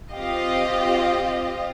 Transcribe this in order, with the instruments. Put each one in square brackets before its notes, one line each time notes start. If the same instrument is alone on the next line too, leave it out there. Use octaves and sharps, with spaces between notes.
[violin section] C4 F4 G4 D#5 F5